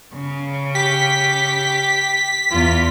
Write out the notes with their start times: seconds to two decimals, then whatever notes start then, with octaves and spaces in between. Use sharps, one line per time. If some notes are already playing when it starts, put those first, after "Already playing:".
0.15 C#3
0.75 G4 B6
2.51 E2 F4